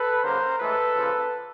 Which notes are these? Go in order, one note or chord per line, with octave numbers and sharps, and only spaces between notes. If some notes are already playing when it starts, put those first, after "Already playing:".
Already playing: A4 B4
C#3 F#3 A#3 A#4 C5
A2 E3 G#3 A4 B4
C#3 F3 A#3